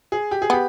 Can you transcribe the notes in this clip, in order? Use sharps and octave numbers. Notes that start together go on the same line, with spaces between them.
G#4
G4
G#4
B3 G4